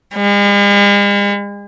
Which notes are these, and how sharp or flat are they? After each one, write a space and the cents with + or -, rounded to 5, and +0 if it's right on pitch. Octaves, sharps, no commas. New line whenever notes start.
G#3 -45